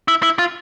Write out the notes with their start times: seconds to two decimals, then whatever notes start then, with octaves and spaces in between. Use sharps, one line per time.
0.08 E4
0.23 E4
0.39 F4